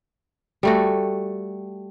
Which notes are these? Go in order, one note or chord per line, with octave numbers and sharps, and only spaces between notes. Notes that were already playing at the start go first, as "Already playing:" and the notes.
G3 A3 F#4